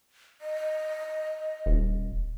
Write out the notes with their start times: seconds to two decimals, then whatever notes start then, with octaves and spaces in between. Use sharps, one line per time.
0.41 D#5
1.66 D#1